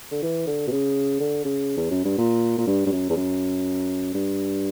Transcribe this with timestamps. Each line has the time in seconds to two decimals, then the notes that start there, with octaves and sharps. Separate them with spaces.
0.11 D3
0.23 E3
0.47 D3
0.67 B2
0.71 C#3
1.20 D3
1.45 C#3
1.77 E2
1.91 F#2
2.05 G2
2.18 A#2
2.58 A#2
2.67 G2
2.86 G2
2.92 F#2
3.10 E2
3.16 F#2
4.14 G2